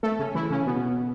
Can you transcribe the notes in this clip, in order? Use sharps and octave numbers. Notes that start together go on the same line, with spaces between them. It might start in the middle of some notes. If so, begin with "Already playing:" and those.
A3 A4
C#3 C#4
E3 E4
C#3 C#4
B2 B3